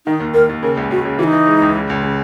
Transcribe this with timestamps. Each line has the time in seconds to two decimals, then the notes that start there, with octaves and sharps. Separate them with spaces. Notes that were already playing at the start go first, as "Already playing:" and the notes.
0.06 D#3 D#4
0.20 D#2
0.34 D#2 A#4
0.49 D#2
0.63 C#3 A#4
0.77 C#2
0.91 C#2 F#4
1.05 C#3
1.19 E3 F#4
1.23 D#4
1.33 E3
1.47 G#3
1.62 C#2
1.76 C#3
1.90 C#2
2.03 C#3